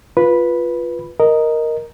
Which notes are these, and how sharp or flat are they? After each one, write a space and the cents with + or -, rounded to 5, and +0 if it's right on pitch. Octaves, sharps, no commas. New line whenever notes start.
F4 +0 B4 -10 B5 +0
A#4 +0 D#5 +0